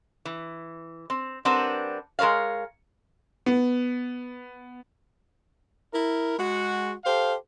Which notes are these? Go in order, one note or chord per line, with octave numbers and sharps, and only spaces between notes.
E3
C4
G3 C4 D4 A#4 B4 F#5
G#3 A#4 B4 C#5 F5
B3
E4 A#4
G#3 F#4
G4 A4 C5 F5